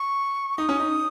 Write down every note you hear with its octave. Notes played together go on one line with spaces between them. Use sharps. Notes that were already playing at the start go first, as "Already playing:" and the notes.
Already playing: C#6
D#4 D#6
C#4
D#4